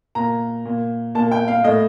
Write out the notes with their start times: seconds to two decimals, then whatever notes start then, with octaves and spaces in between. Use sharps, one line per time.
0.15 A#2 A#5
0.65 A#2
1.15 A#2 A5
1.31 G5
1.48 F5
1.64 A2 D#5